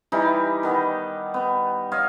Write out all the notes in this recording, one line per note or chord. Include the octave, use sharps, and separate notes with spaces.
E3 G3 D#4 G4
D#3 B3 D#5
B3
C#5 D#5 F5